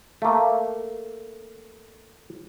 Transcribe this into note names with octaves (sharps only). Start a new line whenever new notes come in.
A3 A#3